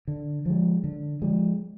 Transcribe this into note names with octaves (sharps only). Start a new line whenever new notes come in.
D3
F3 G#3
D3
F3 G#3